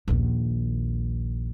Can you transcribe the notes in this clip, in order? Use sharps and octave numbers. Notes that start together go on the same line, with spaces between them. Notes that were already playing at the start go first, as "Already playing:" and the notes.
A#1 D#2